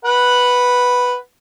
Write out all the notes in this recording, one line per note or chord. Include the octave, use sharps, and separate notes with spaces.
B4 F#5